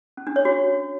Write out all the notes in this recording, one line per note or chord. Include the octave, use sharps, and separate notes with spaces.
C#4
D4
C#5
F#4